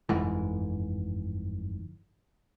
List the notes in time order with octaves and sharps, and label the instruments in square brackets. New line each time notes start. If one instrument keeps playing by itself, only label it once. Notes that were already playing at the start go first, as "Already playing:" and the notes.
[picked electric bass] G1 F2 G#2 E3